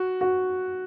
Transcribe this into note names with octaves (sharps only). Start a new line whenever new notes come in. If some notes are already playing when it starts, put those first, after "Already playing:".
Already playing: F#4
F#4